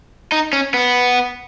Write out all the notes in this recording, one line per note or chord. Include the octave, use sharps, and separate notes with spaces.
D#4
C#4
B3